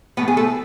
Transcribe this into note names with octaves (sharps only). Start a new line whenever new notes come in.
A2 F3 A3 B3 B4
G#4
A3 A4